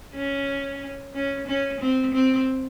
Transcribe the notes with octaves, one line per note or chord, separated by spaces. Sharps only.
C#4
C#4
C#4
C4
C4